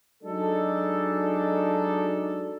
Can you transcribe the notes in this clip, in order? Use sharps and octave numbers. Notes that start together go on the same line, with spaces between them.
F#3 G#3 D4 D#4 A4